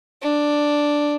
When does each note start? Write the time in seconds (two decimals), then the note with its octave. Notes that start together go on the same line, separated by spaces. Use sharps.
0.23 D4